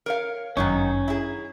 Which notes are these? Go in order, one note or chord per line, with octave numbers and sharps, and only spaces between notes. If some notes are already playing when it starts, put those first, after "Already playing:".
A#4 C#5 F5
G1 F#2 D#3 F#3 C#4 D#4
E4 G#4 A#5